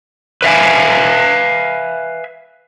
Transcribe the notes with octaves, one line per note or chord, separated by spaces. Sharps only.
B4 E5 F5 G#5